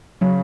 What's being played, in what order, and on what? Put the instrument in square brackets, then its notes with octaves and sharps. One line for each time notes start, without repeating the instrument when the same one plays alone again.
[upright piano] C#3 C#4 [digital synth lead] F#3